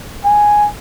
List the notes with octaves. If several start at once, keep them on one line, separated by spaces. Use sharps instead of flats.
G#5